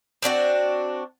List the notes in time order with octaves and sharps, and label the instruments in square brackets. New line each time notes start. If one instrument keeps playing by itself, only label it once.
[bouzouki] C4 D4 D#4 F#4